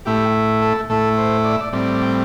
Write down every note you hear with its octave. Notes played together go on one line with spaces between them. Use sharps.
A2 A3 E4 G4
A4
A2 A3 E4 A4
C5
D5
E5
D5
A2 G3 C4 D5
G5